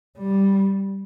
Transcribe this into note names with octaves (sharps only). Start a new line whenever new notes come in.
G3